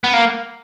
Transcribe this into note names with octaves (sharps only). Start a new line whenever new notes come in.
B3
A#3